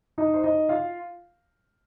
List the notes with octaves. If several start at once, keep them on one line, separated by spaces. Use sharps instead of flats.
D#4 D#5
C5
D#4 D#5
F4 F5